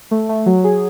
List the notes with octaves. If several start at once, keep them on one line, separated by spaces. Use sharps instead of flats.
A3
A3
F#3
G#4